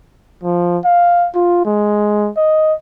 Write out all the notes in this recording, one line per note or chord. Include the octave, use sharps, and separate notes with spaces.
F3
F5
F4
G#3
D#5